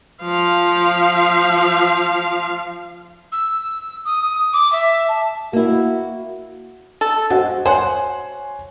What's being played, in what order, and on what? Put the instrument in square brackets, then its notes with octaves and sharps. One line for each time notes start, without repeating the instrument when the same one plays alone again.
[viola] F3 F5
[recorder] E6
D#6
D6
E5
A5
[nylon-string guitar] A#3 E4 [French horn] F#4
[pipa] A4
[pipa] G#3 [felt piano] F#4 C5 F#5
[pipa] C5 F#5 [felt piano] C#5 G#5 C6